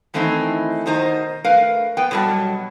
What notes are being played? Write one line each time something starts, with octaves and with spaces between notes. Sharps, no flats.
D#3 E3 A3 C4 D#4 E4
B2 D#3 D#4 C5 D#5 A#5
A3 A#4 B4 F5
B3 B4 G5
B2 F#3 G3 A4 A5